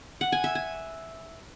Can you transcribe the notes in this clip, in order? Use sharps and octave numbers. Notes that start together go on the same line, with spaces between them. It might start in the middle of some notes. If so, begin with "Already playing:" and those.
F#5
G#5
E5
G#5